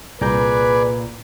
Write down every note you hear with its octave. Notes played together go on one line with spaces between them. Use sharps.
C2 A#2 G#4 B4 D5 A#5 G6